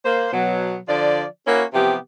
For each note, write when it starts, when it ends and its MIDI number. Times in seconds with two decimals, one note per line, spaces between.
0.05 0.31 58
0.05 0.31 72
0.32 0.77 47
0.32 0.77 54
0.88 1.24 50
0.88 1.24 53
0.88 1.24 65
0.88 1.24 74
1.47 1.64 58
1.47 1.64 61
1.47 1.64 64
1.47 1.64 66
1.74 1.97 48
1.74 1.97 52
1.74 1.97 53
1.74 1.97 59
1.74 1.97 67